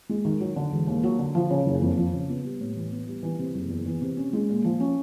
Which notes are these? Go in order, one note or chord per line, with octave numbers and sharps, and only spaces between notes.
G#3
D#3
F#3
D3
E1
D#2
F#3
D3
F3
C#3
F#1
F2
F3
C#3
B3
G3
A2
E3
B3
G3
E3
C3
F#1
E2
E3
C3
C#4
G#3
A#2
F3
C#4